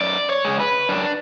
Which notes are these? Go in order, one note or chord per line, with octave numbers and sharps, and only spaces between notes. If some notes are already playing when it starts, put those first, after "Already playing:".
F#2 D5
C#5
C#3 G#3
B4
F#2 D4